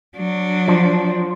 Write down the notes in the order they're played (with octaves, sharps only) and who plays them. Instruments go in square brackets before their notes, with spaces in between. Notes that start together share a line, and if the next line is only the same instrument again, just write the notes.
[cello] F#3 D4
[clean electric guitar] F3